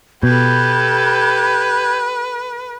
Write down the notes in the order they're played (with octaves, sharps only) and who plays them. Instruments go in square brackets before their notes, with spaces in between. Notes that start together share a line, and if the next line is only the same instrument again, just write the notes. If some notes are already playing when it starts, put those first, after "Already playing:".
[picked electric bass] B2 [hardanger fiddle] G4 A4 [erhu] B4 [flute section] B5 G6 G#6